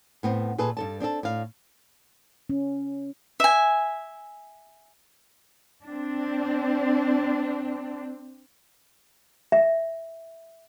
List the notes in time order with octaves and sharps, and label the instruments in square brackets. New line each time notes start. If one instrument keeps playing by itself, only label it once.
[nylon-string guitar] A2 B3 C4
A#2 G#4 A4 B4
G2 A4 A5
C4 D4 G4 A4
A2 F5
[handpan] C#4
[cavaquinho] E5 G#5
[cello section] C4 D4
[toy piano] E5